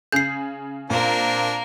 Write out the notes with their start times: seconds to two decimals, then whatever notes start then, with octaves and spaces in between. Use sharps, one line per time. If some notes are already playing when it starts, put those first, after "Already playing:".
0.12 C#3 G#4 G6 C7
0.90 A#2 A#3 C4 D4 F4 A#4